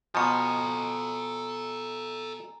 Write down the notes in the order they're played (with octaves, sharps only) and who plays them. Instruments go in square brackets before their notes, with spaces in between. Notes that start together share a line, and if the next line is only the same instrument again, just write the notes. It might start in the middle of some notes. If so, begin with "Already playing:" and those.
[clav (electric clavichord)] B2 F3 [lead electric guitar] A4 D#5 [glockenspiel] G#5 A#5 C#7